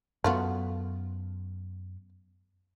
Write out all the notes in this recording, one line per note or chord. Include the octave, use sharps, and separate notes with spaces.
F#2 A3 B3 F4 F#4